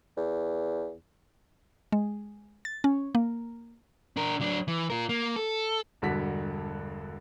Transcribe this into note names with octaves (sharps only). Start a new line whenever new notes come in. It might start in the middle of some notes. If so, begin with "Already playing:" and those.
E2
G#3
A6
C#4
A#3
D4 A#4
F#3 D4
E3
F4 A#4
A#3
A4
E1 G2 D3 F#4 B6